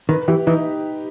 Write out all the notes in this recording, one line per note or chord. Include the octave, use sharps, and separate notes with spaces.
D#3 B4
E3 G4
E3 D#4